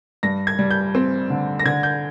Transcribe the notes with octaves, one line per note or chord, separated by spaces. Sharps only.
G2 A#6
G#6
G3
G6
C4
D3
A#6
D3 G#6
G6